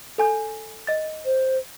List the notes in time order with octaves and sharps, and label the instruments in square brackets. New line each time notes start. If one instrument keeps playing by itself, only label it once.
[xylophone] A4 G#5 G6
D#5 A6
[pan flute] C5